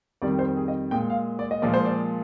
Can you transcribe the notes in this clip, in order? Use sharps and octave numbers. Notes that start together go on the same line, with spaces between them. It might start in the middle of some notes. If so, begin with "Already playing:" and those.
F2 D#3 G3 D5
C5
G#4
D#5
A#2 G#3 G5
F5
D5
D#5
A#2 F3 G#3 D5
C5
D5